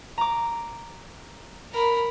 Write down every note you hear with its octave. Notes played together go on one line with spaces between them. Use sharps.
A#5 D6
A#4 B5